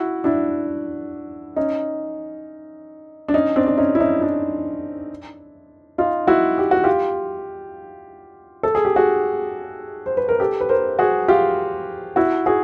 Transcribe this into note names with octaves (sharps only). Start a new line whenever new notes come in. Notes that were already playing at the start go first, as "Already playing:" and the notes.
Already playing: E4 F#4
D4 E4
C#4 D#4
D4
C#4 D#4
C4 D4
D4
C#4 D#4
E4
C#4 D#4
D4 E4
D#4 F4
E4 F#4
G4
F#4
F4 G4
A4
G#4
G4
F#4 G#4
C5
B4
A#4
G4 A4
B4
A#4 C5
F#4 G#4
F4 G4
E4 F#4
F#4 G#4